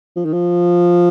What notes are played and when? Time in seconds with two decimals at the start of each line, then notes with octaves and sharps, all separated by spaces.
0.16 F3
0.25 D#3
0.33 F3